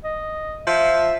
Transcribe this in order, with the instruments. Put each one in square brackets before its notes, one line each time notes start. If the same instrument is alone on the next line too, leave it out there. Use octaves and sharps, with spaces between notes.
[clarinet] D#5
[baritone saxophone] F3 [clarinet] E5